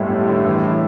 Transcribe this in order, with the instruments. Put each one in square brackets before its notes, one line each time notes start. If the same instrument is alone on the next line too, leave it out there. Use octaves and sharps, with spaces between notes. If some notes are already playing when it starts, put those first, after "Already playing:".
Already playing: [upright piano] G1 G3 G#3 [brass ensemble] A2
[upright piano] G3
D3
E3